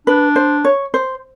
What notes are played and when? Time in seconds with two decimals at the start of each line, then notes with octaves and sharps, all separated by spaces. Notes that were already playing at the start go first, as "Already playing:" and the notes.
0.07 D4 B4
0.36 C5
0.64 C#5
0.94 C5